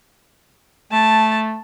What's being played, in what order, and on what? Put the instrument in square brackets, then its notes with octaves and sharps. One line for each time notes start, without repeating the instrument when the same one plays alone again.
[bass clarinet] A3 [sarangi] A5